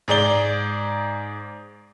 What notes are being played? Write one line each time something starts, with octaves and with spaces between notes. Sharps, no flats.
G#2 G#4 D5 G7